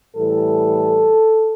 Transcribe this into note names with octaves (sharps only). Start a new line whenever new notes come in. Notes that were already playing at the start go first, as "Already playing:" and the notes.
A2 E3 G3 A4